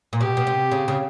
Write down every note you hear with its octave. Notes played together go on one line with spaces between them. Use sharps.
A#2
B2 G4
B2
C3
C#3
C#3